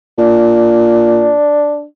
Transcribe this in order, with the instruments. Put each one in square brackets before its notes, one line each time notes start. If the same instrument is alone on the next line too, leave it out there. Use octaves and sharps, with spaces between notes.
[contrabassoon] A#2 [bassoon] D4